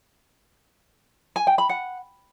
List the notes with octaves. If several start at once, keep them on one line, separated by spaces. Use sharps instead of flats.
G#5
G5
B5
F#5